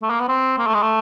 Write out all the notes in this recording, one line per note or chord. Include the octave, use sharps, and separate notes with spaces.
A3
A#3
B3
C4
A#3
A3
G#3
A3